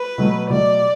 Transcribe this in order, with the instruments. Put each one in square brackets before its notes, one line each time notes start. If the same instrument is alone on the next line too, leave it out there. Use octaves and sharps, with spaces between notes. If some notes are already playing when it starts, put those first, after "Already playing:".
Already playing: [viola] B4
[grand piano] B2 F#3 A3
[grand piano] B2 F#3 A3 [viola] D5